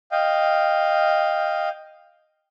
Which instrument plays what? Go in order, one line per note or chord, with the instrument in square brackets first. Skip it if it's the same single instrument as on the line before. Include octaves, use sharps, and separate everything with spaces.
[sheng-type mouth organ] D#5 F5 G5